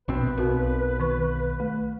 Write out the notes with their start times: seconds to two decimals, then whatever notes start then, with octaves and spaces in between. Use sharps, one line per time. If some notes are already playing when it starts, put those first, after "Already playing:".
0.08 A#1 B2 C4 B4
0.38 B1 C4 F#4 A#4
1.00 D#3 C#6
1.60 A3